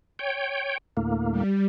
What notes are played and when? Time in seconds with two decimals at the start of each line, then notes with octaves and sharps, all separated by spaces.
0.19 C#5 G5
0.97 D2 A2 A#3
1.31 G3